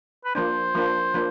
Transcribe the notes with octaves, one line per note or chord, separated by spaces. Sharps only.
B4
F3 A#3 D4 C5
F3 A#3 D4
F3 A#3 D4